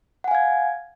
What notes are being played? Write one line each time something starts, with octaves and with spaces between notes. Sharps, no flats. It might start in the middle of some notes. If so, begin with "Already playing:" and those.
F5 F#5 G#5 G#6